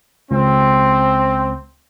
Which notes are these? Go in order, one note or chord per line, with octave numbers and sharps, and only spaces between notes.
C#2 C4